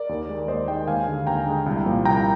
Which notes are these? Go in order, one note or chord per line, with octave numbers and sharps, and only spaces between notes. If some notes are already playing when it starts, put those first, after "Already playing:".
Already playing: A#4 D5
D#2
D#3 G#3
D#2 C5 D#5
D#3 G#3 D#5 G5
D#2 F5 G#5
D3 G#3
D#2 G5 A#5
D3 G#3
C2
A#2 F3 A#3
C2 G5 A#5